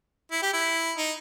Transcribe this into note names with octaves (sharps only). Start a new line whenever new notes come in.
E4
G4
E4
D#4